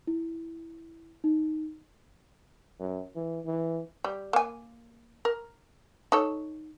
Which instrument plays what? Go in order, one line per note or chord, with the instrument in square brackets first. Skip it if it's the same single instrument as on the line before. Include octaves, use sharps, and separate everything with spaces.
[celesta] E4
D#4
[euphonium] F#2
E3
E3
[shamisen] G3
A#3 G#5
A#4
D#4 A4 C#5